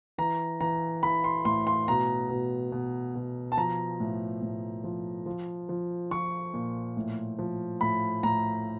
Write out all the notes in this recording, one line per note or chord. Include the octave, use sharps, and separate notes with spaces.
E3 A#5
E3 A#5
E3 B5
C6
A2 C6
C6
B2 A#5
B2
B2
B2
A5
F3 A#5
A2
A2
F3
F3
F3
F3 C#6
A#2
A2
F3
A2 B5
A2 A#5